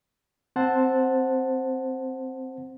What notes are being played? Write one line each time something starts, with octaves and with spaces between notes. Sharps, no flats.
C4 C5 F#5 A5